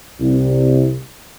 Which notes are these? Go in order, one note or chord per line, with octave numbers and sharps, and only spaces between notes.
C2